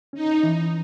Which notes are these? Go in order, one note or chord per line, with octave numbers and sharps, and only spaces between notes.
C#4 D#4
E3